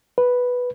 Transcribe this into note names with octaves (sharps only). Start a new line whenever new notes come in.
B4